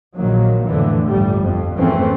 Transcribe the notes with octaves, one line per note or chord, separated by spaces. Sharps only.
A#1 A#2 D#3 F#3 A#3
F2 A2 D3 E3
G1 C2 A2 G3
F2
G#1 F2 E3 A3 C4 C#4